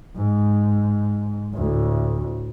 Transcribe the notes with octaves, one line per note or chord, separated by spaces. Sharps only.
G#2
D2 A2